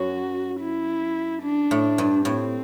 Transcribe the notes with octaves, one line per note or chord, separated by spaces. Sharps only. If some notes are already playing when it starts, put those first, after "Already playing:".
Already playing: F#2 F#3 F#4
E4
D4
A2
G2
A2 C4